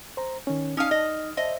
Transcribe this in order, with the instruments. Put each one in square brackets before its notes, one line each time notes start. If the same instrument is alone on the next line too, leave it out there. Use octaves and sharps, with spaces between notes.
[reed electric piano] C5 A#5
D#3 C#4
[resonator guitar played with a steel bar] C#4 F5 [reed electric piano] D#4 D#6 F6
[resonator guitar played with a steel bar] D#5
[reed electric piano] C5 E5 [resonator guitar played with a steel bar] D#5